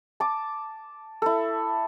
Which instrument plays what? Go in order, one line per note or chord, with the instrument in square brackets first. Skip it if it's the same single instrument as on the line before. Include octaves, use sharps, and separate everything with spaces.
[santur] A5 D6
E4 A4